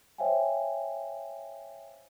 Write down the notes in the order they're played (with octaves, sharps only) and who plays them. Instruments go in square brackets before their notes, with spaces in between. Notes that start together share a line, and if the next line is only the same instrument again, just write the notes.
[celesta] C5 C#5 E5 F5 G5 G#5